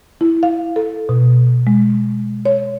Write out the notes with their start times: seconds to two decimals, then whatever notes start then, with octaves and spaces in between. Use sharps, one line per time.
0.21 E4
0.43 F5
0.76 A4
1.09 B2
1.67 G#3
2.45 C#5